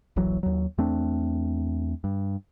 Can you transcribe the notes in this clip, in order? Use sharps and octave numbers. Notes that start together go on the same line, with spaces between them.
D#1 A#1 E3 F#3
D#2 F#3
E2 A3 C4 D4
G2